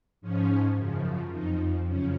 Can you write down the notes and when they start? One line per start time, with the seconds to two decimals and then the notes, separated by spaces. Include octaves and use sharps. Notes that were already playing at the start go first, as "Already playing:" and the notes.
0.21 G#2 F3 C#4
0.76 F#2 C#3 F3
1.31 F2 F3 D#4
1.87 F#2 C#3 F3 C#4